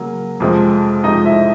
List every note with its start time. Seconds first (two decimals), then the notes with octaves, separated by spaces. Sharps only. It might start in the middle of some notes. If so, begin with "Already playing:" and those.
Already playing: C#3 F#3 A#3
0.40 F2 C3 F3 G#3
1.04 F2 C3 F3 G#3 D#4 D#5
1.25 E4 E5